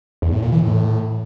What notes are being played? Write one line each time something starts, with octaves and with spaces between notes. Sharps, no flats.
E2
A2
A#2
E3
A2